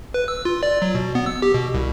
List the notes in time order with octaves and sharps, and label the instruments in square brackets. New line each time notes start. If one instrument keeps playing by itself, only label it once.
[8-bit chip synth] B4
E6
F4
D5
F#3
B2
B3
E6
G4
B2
C2